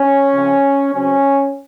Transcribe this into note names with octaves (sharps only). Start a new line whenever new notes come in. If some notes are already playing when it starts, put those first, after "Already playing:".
Already playing: C#4
C#3 F3 C4
C#3 F#3 C4 C#4